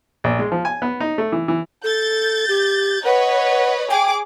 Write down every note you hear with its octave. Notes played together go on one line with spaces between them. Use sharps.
A#1
G#3
F3
G#5
B3
D#4
A3
E3
E3
A4 G6 A6
G4
B4 C#5 D#5 F#5
G#4 G5 D6